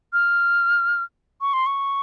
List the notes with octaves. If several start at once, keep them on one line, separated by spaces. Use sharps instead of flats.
F6
C#6
C6
C#6